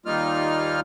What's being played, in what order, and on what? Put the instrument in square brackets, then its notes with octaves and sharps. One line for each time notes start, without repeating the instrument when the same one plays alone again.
[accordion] D#2 G3 A#3 D#4 F4 F6